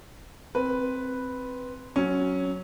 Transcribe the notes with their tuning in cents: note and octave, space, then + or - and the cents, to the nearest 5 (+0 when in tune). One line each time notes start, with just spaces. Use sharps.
C4 +0 B4 +0
F#3 +0 C#4 +0